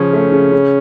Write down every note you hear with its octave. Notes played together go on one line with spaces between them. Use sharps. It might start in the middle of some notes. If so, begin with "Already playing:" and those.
Already playing: C#3 F3 C#4
A3
C#3
C#3